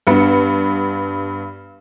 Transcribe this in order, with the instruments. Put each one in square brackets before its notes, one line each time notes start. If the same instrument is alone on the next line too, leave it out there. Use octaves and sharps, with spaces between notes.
[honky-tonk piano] G2 B3 C#7